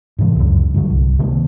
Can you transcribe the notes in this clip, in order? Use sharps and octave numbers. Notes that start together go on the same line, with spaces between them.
G#2 C3 E3 G#3
C#2 F#2
G2 D3 F#3
C2
C3 D#3 G#3 A#3